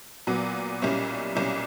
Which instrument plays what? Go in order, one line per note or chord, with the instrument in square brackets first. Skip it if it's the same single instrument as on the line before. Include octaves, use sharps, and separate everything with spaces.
[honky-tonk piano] A#2 F#3 B3
B1 A#2 G3 C#4 E4
B1 A#2 G3 C#4 E4